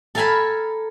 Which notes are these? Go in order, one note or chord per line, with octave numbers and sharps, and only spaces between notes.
A4 A#4 F5 G#5 A5 B5